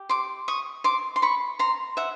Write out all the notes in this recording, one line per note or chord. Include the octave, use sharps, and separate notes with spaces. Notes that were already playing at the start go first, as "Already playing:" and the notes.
Already playing: G4
C6 D6
C#6 D#6
C6 D6
C6
B5 C#6
A#5 C6
E5 F#5